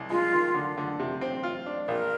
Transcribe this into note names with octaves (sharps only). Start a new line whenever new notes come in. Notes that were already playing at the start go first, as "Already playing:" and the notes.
Already playing: C2
G#3 F4
D#3
D3
D3
C3
C4
F4
D4
A#1 A#4